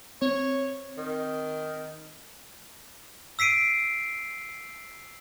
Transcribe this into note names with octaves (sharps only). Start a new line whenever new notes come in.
C4 C#5
D#3
E6 B6 C7 D7 D#7